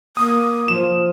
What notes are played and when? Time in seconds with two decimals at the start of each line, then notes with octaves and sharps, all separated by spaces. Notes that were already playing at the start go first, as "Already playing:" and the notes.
0.17 A#3 D#6
0.68 F3 E7